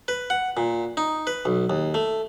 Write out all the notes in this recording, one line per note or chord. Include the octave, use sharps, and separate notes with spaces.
B4
F#5
A#2
D#4
B4
B1
D#2
A3